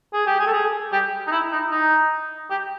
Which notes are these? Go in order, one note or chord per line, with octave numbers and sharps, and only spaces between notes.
G#4
G4
G#4
A4
G#4
G4
D#4
E4
D#4
D#4
G4